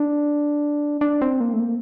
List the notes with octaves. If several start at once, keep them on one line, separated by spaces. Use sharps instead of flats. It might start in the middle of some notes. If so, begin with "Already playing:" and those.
Already playing: D4
D4
C4
A#3
A3
A#3